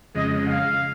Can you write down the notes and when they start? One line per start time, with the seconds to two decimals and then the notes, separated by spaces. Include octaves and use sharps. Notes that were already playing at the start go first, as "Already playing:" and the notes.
0.15 F2 C#3 G#3 D#5
0.46 F5